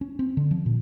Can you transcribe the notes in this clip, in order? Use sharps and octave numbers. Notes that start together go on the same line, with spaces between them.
C#4
C4
D3
F3
A#2